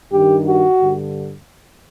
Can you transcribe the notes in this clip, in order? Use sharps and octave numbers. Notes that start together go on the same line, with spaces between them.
G2 D#3 G4
F#4
G2 D3